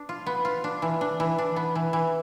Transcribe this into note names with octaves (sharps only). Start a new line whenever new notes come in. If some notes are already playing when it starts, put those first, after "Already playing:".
Already playing: D4
F4
B3
F4
D4
E3
D4
E3
D4
B3
E3
E3